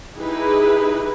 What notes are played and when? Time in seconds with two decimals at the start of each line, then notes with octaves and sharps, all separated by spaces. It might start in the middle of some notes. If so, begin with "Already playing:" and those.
0.18 D#4 E4 G4 G#4 B4